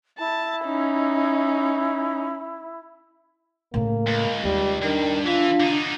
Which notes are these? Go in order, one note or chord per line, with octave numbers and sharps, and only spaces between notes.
E4 A5
C#4 D#4
A2 C#3 A#3
C#2
D#2 G3
G2 D#3 D4
E3 F4
D3 D#4